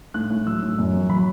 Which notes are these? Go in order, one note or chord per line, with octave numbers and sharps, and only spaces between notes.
A2 F#6
A2
F#3 E6
A2
F#2
F#3
F#3 B5